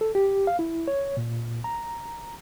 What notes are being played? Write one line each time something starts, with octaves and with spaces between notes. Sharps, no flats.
A4
G4
F5
E4
C#5
A#2
A#5